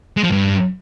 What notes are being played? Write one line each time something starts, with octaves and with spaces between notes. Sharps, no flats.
G#3
F3
G2